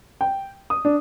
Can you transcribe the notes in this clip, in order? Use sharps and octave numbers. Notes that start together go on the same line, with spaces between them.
G5
D#6
D4